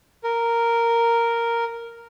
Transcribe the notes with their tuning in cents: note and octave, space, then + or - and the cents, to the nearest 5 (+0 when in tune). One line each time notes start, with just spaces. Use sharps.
A#4 -5